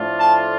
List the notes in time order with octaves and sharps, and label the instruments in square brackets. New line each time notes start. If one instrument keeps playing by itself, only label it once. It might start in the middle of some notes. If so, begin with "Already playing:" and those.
Already playing: [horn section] A2 F3 A3 D4 F4
A5